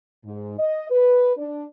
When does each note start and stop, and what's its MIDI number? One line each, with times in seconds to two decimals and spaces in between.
0.25 0.55 44
0.58 0.89 75
0.90 1.33 71
1.37 1.64 62